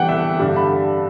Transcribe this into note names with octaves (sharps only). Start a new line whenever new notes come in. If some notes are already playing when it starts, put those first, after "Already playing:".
Already playing: E3 G3 B3 D4 F#5 G5
E5
G2 D3 G3 D4
B5